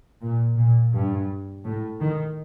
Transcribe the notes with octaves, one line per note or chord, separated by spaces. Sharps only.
A#2
A#2
G2
A2
D#3